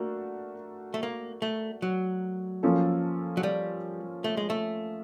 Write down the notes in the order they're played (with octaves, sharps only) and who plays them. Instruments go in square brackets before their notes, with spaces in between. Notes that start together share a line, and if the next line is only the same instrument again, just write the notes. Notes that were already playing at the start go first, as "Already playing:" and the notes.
Already playing: [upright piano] A3 D4 F#4 A#4 [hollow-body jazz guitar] A#3
[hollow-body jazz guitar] A3
A#3
A3
F#3
[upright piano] F3 A#3 C#4 F4 A4
[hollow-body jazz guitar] F#3
G3
A3
G#3
A3